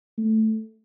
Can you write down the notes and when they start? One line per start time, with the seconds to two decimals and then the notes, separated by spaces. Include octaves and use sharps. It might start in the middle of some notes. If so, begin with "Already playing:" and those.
0.18 A3